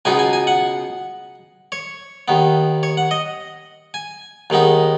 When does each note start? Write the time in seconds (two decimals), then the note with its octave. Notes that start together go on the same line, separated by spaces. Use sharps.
0.05 C#2 B2 B3 D#4 G#5
0.19 G#5
0.33 G#5
0.47 F#5
1.72 C#5
2.28 D#2 D#3 B3
2.83 C#5
2.97 F#5
3.11 D#5
3.94 G#5
4.50 D#2 D#3 G#3 B3 D#4